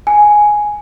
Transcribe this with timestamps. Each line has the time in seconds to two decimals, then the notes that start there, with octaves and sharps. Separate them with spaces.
0.07 G#5